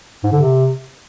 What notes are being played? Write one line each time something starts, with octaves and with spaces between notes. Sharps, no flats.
G#2
D3
C3